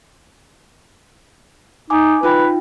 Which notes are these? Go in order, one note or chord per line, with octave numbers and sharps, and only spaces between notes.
D#4 G#5 D6
D#4 F4 B4 G5